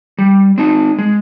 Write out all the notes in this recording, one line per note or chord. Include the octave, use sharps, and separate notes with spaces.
G3
C4 D#4
G#3